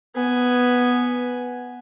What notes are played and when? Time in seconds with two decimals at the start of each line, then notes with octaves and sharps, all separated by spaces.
0.15 B3 G#5